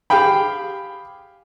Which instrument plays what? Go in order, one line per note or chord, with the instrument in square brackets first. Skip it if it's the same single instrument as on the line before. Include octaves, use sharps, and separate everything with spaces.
[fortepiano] G4 G#4 F5 G5 B5